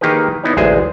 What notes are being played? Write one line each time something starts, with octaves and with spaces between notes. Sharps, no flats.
D#3 A#3 D#4 G4 G#4 B4
B3 D#4 E4 C#5
A1 D2 G#3 G#4 C5 G#5